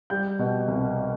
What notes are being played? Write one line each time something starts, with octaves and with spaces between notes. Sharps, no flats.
G3 G5 G6
B2
C2